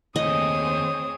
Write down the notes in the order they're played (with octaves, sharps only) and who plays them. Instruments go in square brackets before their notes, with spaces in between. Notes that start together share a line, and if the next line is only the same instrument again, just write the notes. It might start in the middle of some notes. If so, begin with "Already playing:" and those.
[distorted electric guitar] D#2 A3 [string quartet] C4 G#4 C#5 [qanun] D#5 [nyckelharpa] D#6